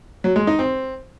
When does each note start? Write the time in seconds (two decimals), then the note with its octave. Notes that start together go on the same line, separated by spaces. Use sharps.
0.24 F#3
0.36 G#3
0.47 D#4
0.59 C4